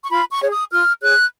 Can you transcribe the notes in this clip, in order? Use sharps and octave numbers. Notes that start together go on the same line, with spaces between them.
C#6
F4 B5
C#6
G#4 C#5
D#6
F4 F6
G#4 C#5 F#6